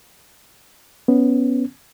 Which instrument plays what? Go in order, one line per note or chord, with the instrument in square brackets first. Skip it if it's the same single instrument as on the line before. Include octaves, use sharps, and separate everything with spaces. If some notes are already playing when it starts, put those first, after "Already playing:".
[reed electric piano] B3 C#4